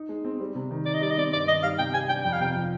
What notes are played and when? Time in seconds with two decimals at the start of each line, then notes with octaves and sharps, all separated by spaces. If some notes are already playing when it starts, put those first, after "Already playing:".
Already playing: D#4
0.09 G#3
0.25 C4
0.40 G3
0.55 C3
0.71 D#3
0.86 D#3 D5
0.94 D#5
1.01 G3 D5
1.10 D#5
1.17 C4 D5
1.33 G2 D5
1.47 D#3 D#5
1.63 G3 F5
1.79 C3 G5
1.94 G3 G#5
2.09 D4 G5
2.24 F2 G5
2.33 F5
2.41 C3 G5
2.56 F3